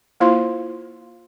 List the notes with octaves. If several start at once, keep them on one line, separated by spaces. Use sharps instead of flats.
A#3 E4 F4 C5 F5 C6